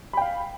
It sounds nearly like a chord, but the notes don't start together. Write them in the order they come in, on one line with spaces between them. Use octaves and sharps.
B5 G5 F5